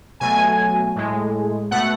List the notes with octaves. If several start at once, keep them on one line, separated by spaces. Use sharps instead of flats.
B2 F#3 A3 G#5
A2 G#3
B2 A3 F#5